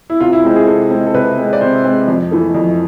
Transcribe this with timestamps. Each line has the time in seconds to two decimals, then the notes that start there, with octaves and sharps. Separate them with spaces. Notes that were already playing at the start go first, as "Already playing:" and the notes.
0.10 E4
0.20 C3 F4
0.33 E4
0.44 G#3 C4
0.56 G#4
0.67 C3 A4
0.91 G#3 C4
1.06 A4
1.14 C3 B4
1.38 G#3 C4
1.53 D5
1.61 C3 C5
1.84 G#3 C4
2.08 F2
2.31 E3 A3
2.55 F2